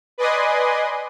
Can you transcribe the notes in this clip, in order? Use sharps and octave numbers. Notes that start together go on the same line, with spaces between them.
B4 D5 D#5 G#5 C6 D#6